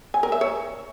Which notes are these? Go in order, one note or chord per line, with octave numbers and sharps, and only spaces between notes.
G#5
A#4
E5
C#5